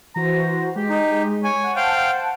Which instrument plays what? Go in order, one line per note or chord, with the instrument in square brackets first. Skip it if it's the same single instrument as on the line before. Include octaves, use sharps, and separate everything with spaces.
[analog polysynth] E3 F#4 C5 [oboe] A#5
[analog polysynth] G#3 [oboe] G4
[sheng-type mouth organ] D#4
[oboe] C#5 [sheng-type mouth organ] G#5
[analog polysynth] F#5 A5
[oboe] C5 [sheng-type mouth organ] F5 G5